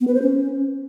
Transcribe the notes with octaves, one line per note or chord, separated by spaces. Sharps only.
B3
B4
C5
C#4